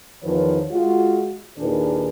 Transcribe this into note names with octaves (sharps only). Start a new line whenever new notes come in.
E2 D#3 F3 B4 C#5
G#3 F4 F#4
D#2 A#2 D#3 D4 G#4 B4